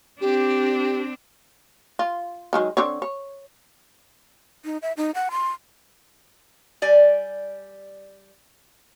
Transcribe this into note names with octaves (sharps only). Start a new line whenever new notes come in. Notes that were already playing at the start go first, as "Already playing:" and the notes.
C4 D4 G4
F4
D#3 F#3 G#3
D3 C4 C#5
C#5
D#4
E5
D#4
F#5
C6
G3 D5 G#5